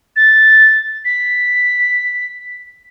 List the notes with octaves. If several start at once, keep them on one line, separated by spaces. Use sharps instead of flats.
A6
B6